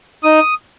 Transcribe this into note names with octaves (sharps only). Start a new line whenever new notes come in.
D#4 D#6